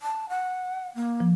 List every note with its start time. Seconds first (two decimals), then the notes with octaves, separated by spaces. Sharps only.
0.02 A5
0.29 F#5
0.95 A#3
1.20 F3